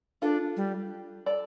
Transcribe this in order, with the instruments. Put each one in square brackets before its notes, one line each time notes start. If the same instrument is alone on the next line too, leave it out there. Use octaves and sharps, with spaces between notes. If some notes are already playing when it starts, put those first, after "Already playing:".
[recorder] D4 [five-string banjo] F4 A4
[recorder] G3
[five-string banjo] A4 D5